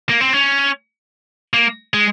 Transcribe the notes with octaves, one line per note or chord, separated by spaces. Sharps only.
A#3
C4
C#4
A#3
G#3